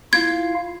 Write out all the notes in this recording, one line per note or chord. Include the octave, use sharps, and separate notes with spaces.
E4 F4 F5 G#6